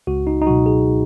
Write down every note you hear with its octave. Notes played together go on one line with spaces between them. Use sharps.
C#2 F#4
D#4
D#4
B2 F#3 F#4
G#4